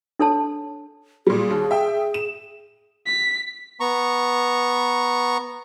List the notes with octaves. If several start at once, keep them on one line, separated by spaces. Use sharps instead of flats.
D4 A4 C#5 A5
A#2 G3 G#4
D#2
E5 G5
E7
B6
B3 A#5 C#6